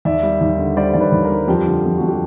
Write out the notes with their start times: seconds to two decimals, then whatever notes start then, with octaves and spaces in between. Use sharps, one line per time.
0.05 D#2 D5 E5
0.23 G3
0.41 D#2
0.59 D3
0.77 G3 C5 D5
0.94 D#2 D5
1.01 B4 C#5
1.12 D#2
1.24 A#4 C5
1.30 G3
1.48 F2 F4 G4
1.66 D3
1.84 F2
1.97 F2 F#4
2.08 G4